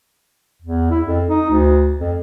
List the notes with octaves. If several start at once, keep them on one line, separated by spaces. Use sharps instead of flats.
E2
E4
F2
D#4
D2
F2